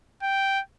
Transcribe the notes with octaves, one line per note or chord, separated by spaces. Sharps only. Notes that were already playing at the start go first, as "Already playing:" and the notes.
G5